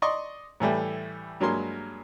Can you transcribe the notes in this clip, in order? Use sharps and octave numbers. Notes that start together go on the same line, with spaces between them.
D5 D#5 C6 C#6 D#6
A2 E3 G3 A3
G2 F#3 G#3 A#3 C6